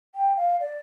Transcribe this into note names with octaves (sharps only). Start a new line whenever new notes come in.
G5
F5
D5